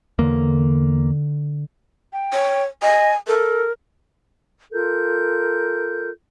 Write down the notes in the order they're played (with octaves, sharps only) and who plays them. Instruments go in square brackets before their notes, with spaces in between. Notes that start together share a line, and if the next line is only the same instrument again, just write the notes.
[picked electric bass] E2 A#3 [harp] D3
[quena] G5
[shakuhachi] C#5
[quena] D#5 [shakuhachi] G#5
[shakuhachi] A4 [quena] A#4
[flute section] F4 A4 A#4 G6